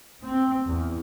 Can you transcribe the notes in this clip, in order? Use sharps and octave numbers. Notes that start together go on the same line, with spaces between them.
C4
E2